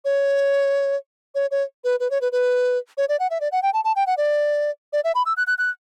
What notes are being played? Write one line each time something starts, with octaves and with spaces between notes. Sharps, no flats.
C#5
C#5
C#5
B4
B4
C#5
B4
B4
C#5
D5
F#5
E5
D5
F#5
G5
A5
A5
G5
F#5
D5
D5
E5
B5
E6
F#6
F#6
F#6